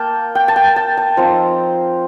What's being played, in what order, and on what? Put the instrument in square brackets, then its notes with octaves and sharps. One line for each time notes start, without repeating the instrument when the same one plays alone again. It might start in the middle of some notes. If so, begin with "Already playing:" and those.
Already playing: [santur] A#3 G5 A5
G5
A5
G5
A5
A5
F3 C4 D#4 A#5